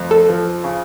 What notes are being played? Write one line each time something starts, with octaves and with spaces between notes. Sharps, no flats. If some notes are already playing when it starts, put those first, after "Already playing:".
Already playing: F2 A3
A4
F3
C#3